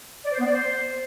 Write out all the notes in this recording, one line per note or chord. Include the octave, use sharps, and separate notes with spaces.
D5
C5
B3
D5
C5